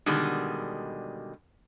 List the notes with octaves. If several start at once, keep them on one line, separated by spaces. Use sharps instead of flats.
B2 D3 D#3 G3 G#3